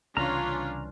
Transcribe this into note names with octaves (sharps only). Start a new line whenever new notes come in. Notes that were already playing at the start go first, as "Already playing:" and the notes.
C2 C#3 E3 C#4 D4 F4 A#5 F6